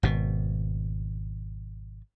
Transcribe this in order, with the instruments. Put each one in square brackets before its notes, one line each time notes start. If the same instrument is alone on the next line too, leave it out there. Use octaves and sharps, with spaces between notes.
[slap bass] G#1 B2